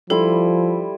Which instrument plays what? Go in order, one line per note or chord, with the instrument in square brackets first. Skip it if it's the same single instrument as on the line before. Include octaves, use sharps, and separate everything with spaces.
[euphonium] F3 [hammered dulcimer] G3 E4 C6 [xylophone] A4